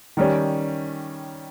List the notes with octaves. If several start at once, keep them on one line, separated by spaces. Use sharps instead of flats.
D#3 G3 C#4